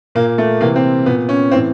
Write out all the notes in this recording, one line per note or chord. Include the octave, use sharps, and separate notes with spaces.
A#2 A#3
A3
C3 E3 A#3
C4
A#2 B3
C#4
A2 E3 C4